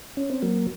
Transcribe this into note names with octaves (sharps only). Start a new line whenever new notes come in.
C#4
C4
F#3 A#3